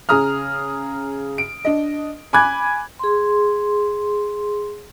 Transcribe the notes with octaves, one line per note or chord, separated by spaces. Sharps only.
C#3 G#4 A#5 D#6 F6
D7
D4 D#5
G#5 B5 D6 F#6 G#6
G#4 C6